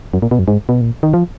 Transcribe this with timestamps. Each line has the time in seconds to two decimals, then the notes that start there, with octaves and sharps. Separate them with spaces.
0.14 F#2
0.22 A#2
0.31 B2
0.39 F#2
0.48 G#2
0.69 B2
0.81 A#2
1.03 D#3
1.14 F3